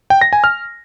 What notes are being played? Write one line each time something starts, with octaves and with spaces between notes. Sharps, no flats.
G5
A#6
G#5
F6